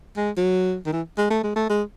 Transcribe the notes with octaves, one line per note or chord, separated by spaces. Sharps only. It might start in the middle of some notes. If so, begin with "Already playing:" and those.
G#3
F#3
D#3
E3
G#3
A3
G#3
A3
G#3